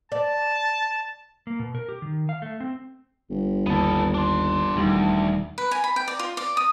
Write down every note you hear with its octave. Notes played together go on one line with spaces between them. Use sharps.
D5 A5
A#3
B2
A#4
G4
D#3
F5
A3
C4
G1
D#2 D3 B3 A4
D4 C6
E1 D2 D#3 G3
B4
G#5
B5
G5
D5
F4
D5
D#6